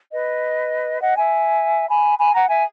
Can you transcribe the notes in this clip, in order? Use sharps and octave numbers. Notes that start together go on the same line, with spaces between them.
B4 D#5
D#5 F#5
E5 G#5
G#5 B5
G#5 B5
F#5 A#5
E5 G#5